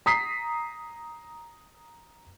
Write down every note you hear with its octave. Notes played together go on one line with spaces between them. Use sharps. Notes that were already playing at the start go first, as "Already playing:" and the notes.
A#5 D#6 B6 C7